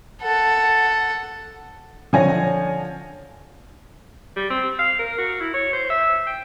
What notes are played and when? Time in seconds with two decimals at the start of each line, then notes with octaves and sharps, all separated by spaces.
0.22 A4 F#5
2.13 D3 F3 C#5 G#5 A#6
4.36 G3
4.50 C4
4.79 F5
4.99 A#4
5.18 F#4
5.40 E4
5.54 C#5
5.73 C5
5.90 E5
6.27 G5